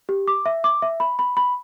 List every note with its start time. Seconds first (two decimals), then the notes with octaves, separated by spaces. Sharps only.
0.09 G4
0.28 D6
0.46 E5
0.64 D6
0.82 E5
1.00 B5
1.19 B5
1.37 B5